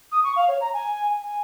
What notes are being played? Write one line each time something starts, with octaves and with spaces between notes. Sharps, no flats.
D#6
C#6
F5
C#5
A#5
G#5
G#5